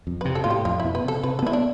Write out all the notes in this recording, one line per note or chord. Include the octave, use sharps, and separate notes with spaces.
F2
C3 B4
A4
A2 F4
G4
F2 F4
B2 E4
B4
C3 A4
C3 B4
A4
B3 E4
D4